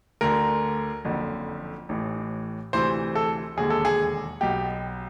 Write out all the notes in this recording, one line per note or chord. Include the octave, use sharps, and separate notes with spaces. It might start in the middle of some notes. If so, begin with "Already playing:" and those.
D2 D3 A#4
F#1 F2 D3
A1 A2 E3
D2 C3 E3 C5
A4
E1 D#2 D3 G#4
A4
G#4
B1 B2 G4